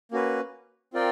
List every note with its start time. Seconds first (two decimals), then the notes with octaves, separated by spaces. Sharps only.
0.11 A#3 C#4 F#4 B4
0.93 C4 F4 A#4 D5 G5